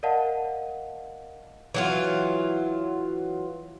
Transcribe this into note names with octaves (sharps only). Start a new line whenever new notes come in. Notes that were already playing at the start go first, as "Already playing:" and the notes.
A#4 D5 D#5 F5 F#5 A5
E3 F#3 F4